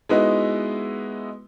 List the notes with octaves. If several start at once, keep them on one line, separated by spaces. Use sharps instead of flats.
G#3 B3 D#4 E4 F#4 B4